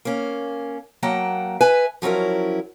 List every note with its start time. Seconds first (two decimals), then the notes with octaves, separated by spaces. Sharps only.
0.05 A#3 C#4
1.03 F#3 A#3 F#5 G5 A5
1.61 B4 E5 G#5
2.02 F3 F#3 C#4 E4 A#4